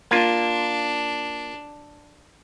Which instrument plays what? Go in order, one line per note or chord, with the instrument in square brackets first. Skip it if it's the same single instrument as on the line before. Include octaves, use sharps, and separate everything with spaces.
[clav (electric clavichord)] A#3 F4 [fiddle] D4